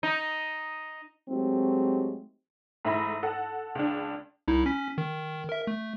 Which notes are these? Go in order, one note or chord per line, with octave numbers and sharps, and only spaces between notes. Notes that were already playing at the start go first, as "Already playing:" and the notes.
D#4
F#3 G#3 A3 C4 D#4 G4
G#2 A3 E4 B5 A#6
A4 F#5
C#2 D4
C2 D#4 E4
C#4 B6
D#3
A#4 E5
A3